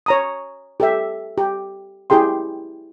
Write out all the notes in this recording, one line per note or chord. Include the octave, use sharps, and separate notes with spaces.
C#5 A#5 D#6
G4 A4 E5
G4
E4 G4 G#4 G5 C6